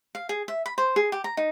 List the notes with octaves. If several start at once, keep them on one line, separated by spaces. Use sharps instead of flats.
F5
G#4
E5
B5
C5
G#4
G4
A#5
D#4